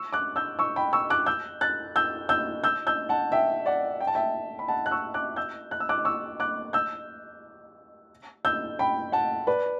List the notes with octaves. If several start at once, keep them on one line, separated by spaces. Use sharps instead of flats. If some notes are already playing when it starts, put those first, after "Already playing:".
Already playing: C#6 E6
D6 F#6
E6 G6
C#6 E6
G5 B5
C#6 E6
D6 F#6
E6 G6
F#6 A6
E6 G6
E6 G6
E6 G6
E6 G6
F#5 A5
E5 G5
D5 F#5
G5
A5
E5 G5
B5
F#5 A5
F#6
C#6 E6
D6 F#6
E6 G6
F#6
E6
D6 F#6
C#6 E6
D6 F#6
E6 G6
E6 G6
G5 B5
F#5 A5
B4 D5